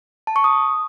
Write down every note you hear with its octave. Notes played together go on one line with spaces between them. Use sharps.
A5
C#6
D#6